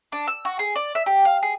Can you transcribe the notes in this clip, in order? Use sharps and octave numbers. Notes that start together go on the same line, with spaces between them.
D4
E6
F#4
G#4
D5
E5
G4
F5
G#4